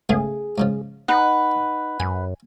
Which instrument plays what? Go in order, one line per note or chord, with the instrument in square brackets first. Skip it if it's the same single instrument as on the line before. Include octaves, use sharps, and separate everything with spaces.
[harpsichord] C#3 A3 B3 [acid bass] G#4
[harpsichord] G#2 C#3 F3
[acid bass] D#4 [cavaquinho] B4 F#5
[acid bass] F#2 [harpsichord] G#5